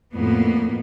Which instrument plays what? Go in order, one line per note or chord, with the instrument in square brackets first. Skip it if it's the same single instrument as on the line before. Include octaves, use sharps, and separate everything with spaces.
[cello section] F2 A2 A#3 B3